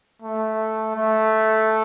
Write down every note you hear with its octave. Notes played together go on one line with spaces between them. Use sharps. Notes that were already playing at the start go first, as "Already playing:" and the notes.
A3
A3